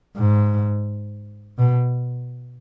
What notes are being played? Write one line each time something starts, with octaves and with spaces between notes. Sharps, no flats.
G#2
B2